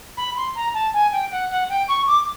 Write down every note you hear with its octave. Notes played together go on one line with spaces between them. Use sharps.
B5
C6
A#5
A5
G#5
G5
F#5
F#5
G5
C#6
D6